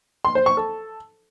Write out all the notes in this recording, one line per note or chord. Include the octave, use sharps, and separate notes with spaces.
C6
C5
C#6
A4